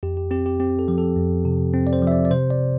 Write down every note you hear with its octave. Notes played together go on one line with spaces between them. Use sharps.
F2 G4
G4
C4 G4
G4
C4 G4
A4
F3
A4
F2
C3
C4
D5
C5
F3 E5
D5
D5
C3 C5
D5